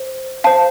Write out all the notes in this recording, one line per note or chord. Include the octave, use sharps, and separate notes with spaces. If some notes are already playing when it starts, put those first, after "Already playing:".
Already playing: C5
C5 F5 A5